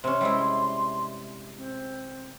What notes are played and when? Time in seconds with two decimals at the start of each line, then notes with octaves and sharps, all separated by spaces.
0.04 C3 C#4 C6
0.21 G3 G#3 E4
1.57 C4